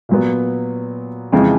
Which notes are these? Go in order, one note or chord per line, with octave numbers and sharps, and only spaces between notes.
A#2 F#3 B3
F2 C#3 E3 G#3